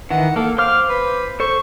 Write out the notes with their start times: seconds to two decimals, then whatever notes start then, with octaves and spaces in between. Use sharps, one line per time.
0.11 D#3 E3 F#5
0.36 A#3 A4
0.58 C5 F5 D6 F6
0.89 B4
1.40 A4 C5 C#6